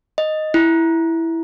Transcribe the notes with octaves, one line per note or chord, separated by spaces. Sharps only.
D#5
E4